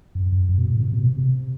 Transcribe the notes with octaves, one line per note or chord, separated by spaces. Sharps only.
F#2
F#2
F#2
B2
A2
C3
B2
C3
C3